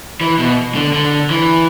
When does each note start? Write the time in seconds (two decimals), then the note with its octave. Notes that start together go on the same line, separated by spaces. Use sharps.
0.21 E3
0.39 B2
0.75 D3
0.93 D3
1.30 E3